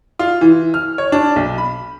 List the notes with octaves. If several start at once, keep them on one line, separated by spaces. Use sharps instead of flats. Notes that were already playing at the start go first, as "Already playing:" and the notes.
F4
E3
F6
C#5
D4
B1
B5